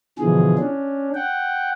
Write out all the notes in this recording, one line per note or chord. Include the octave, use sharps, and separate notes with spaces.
B2 D3 E3 F3 G#4
C#4 D4
F#5 G5